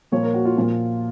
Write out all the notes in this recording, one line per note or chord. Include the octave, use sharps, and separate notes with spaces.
A#2 F3 A#3 C#5
A#4
F#4
F4
A#2 F3 A#3